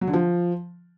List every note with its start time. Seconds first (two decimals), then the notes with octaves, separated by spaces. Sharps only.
0.01 F#3
0.07 D3
0.13 F3